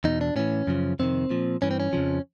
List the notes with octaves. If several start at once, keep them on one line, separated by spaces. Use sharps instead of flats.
E2 B2 D#4
D4
A2 E3 C#4
F#2 C#3 F3
F2 C3 D#3 C4
A#2 F3
G2 E3 C#4
C4
C#4
F2 C#3 F3